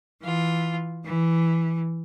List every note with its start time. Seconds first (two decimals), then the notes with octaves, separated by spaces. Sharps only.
0.21 E3 F4
1.05 E3